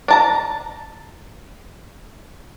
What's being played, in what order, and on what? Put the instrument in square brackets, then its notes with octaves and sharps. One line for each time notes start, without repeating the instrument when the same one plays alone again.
[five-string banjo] D4 A5 A#5